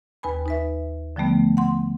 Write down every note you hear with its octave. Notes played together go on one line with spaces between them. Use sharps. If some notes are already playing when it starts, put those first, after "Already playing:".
D#2 B4 G#5 B5
D#4 B4 E5
D3 F3 G3 A3 B3
F#5 C6